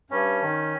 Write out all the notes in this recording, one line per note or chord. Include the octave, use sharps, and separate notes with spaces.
G2 C#4
D#3